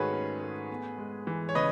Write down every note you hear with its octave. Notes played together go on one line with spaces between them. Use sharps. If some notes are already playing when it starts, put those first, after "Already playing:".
Already playing: G#2 D#3 A3 F#4 G#4 B4 C#5
C#4
A3
B3
G#3
E3
C#5
C#3 B4 D#5